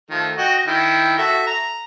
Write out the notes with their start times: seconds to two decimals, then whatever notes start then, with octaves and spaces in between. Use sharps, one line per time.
0.10 D#3 F3 A3
0.37 F#4 D#5 G5
0.67 D#3 E4 G5
1.18 F#4 A4 E5
1.47 A#5